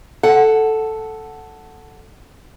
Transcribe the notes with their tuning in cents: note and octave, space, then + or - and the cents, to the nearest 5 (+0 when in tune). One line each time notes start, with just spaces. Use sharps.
A4 +0 F#5 +0